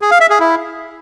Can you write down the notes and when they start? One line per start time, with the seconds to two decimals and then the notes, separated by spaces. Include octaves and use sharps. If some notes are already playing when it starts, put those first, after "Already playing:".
0.02 G#4
0.11 F5
0.21 E5
0.30 G#4
0.40 E4